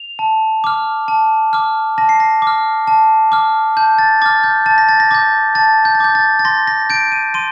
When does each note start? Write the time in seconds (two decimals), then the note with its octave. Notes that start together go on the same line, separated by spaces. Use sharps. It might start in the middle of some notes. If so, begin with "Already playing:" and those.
Already playing: F7
0.19 A5
0.64 D6 F6
1.08 A5
1.53 D6 F6
1.98 A5 A#6
2.09 C7
2.20 A#6
2.42 D6 F6
2.88 A5
3.32 D6 F6
3.77 A5 G6
3.98 A6
4.22 D6 F6 A6
4.44 G6
4.66 A5 A6
4.78 A#6
4.89 A6
5.00 A#6
5.11 D6 G6 A6
5.55 A5 A6
5.85 G6
5.95 A6
6.00 D6 G6
6.15 A6
6.39 A6
6.45 C6 A#6
6.67 A#6
6.90 G6 D7
7.12 D#7
7.34 C6 D#7